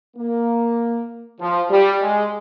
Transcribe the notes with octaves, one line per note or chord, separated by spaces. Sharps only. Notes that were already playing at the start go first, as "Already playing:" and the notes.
A#3
F3
G3
G#3